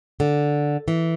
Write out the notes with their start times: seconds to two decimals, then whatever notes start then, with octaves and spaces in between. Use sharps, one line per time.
0.20 D3
0.88 E3